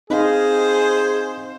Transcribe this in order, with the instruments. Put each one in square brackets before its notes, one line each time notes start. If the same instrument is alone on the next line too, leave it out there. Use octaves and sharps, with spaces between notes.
[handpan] C4 D#5 F5 [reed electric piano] D#4 [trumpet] G#4 [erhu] C5